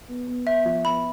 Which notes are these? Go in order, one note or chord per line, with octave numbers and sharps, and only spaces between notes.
B3
B3
B3 E5
F3
B3 B5